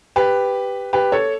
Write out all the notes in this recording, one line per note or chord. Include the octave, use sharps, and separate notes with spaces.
G4 B4
G4 B4
A4 C#5